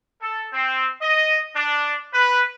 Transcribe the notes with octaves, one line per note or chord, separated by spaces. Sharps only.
A4
C4
D#5
D4
B4